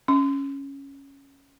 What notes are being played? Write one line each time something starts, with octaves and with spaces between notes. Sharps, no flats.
C#4